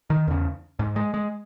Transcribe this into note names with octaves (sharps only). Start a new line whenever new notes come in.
D#3
E2 C#3
G#2
G#3
G#3